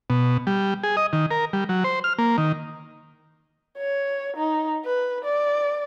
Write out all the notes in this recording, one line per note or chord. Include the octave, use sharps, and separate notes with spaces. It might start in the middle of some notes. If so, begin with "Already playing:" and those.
B2
G3
G#4
D#5
D#3
A#4
G3
F#3
C5
F6
A#3
D#3
C#5
D#4
B4
D5